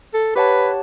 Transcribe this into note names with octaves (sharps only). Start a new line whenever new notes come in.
A4
G4 B4 C#5 F#5 A5